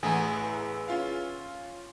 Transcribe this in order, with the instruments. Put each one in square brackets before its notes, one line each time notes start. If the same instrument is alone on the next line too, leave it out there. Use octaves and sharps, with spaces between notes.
[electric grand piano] A1 A3 A#5 [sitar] E3 B3 [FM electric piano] G#4
[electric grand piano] C#4 F4 F5